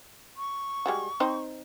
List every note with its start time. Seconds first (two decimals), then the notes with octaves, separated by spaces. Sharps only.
0.37 C#6
0.86 G3 G#3 F#4
1.20 C4 D#4 C5